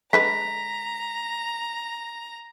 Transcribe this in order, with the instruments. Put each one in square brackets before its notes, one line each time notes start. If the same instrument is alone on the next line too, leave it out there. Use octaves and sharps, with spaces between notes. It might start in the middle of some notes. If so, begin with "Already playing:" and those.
[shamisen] D3 G#3 B4 [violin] A#5 [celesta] B6